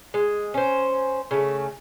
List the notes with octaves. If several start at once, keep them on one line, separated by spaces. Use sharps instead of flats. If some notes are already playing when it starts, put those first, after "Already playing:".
G#3
C#4 C5
C#3 A3